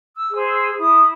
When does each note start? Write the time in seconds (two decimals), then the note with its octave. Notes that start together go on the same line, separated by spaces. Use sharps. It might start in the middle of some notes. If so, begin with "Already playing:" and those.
0.16 E6
0.31 G#4 C5
0.46 E6
0.77 E4 D#6